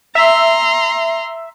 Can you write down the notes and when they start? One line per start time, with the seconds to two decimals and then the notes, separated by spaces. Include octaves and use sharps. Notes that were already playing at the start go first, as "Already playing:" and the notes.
0.15 E5 A#5 C6